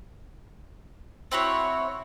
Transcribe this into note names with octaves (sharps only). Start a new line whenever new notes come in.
C4 E4 F#4 C#5